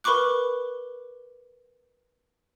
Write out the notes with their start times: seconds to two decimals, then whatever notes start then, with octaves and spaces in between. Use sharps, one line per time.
0.04 A#4 B4 B5 C#6 D6 F#6